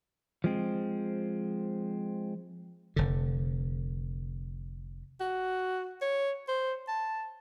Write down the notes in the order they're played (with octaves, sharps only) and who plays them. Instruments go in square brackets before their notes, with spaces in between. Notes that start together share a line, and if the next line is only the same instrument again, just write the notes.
[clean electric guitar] F3 G#3 C4
[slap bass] F1 D3
[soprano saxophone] F#4
C#5
C5
A5